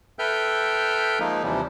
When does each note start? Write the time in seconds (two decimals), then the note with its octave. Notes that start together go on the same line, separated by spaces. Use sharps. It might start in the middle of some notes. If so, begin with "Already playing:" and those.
0.19 A4 B4 E5 G5 F6 G6
1.20 F3 G#3 A#3 D#4
1.43 D#2 C3 E3 F3 G3